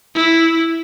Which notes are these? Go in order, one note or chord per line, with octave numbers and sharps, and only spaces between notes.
E4